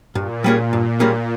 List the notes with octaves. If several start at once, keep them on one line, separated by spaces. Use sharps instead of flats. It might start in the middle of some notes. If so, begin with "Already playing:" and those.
G2 A#2
G3 A#3 C#4 G#4
G2
G3 A#3 C#4 G#4